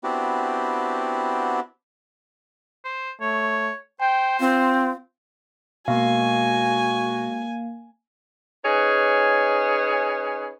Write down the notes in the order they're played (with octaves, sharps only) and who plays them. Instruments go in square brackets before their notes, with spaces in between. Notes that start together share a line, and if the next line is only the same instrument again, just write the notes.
[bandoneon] B3 C4 D4 E4 F#4 G4
[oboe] C5
[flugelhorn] A3 [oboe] C#5
[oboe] C5 [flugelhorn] G5
[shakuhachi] C4 [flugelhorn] F4
[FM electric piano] B2 [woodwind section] G#3 F#4 [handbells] A#3 F5 [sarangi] G#5
[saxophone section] C#4 D#4 G#4 B4 C#5